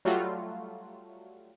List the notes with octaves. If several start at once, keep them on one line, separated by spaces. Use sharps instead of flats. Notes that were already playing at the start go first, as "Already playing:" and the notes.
F#3 G3 A3 F4 F#4